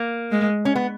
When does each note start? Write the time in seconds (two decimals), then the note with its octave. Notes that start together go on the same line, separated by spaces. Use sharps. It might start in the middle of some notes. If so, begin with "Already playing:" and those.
Already playing: A#3
0.31 G#3
0.65 C#4
0.75 B3